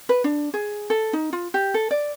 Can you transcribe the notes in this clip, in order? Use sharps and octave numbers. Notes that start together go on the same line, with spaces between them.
B4
D4
G#4
A4
D#4
F4
G4
A4
D5